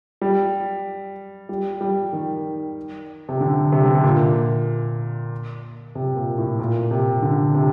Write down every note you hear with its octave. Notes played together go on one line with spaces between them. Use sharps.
G3
G3
G3
D#3
C3
D3
C3
D3
C3
A#2
C3
A#2
A2
A#2
C3
D3
C3